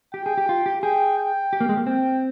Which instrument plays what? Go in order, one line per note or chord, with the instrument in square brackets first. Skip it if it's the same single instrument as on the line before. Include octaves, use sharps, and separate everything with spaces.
[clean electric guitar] G4 [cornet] G5
[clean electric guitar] G#4
G4
F4
G4
[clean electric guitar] G#4 [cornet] G5
[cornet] G5
[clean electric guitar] G4
A#3
G#3
A#3
[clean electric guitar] C4 [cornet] G5